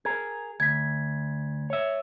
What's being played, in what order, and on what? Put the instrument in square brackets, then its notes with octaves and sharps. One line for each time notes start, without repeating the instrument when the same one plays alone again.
[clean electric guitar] G#4 A#4 [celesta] G#6
[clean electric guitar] D2 [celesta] G#6 B6
[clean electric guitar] C#5 E5